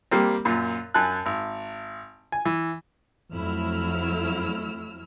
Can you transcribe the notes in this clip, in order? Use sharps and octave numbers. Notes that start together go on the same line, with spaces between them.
G3 A#3 C4
F#2 A#2
F#2 G#5 A5 F#6
G#1
G#5
E3
F2 F#3 A3 E4 E6 F6